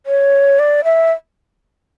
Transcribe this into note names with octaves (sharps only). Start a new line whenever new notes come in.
C#5
D5
E5